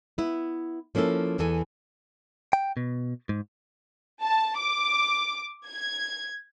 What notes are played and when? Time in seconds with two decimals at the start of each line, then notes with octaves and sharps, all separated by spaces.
0.18 B3 E4
0.95 F3 A#3 C#4 E4 A4
1.39 E2 E3 A4 G#5
2.53 G5
2.77 B2
3.29 G#2
4.22 A5
4.58 D6
5.68 G#6